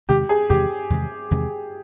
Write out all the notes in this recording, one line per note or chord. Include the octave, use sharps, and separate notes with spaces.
E2 C3 D#3 G#3 G4
G#4
E2 C3 D#3 G#3 G4
E2 C3 D#3 G#3
E2 C3 D#3 G#3